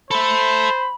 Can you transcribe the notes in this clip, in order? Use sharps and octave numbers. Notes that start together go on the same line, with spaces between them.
A4 C5 E5 B5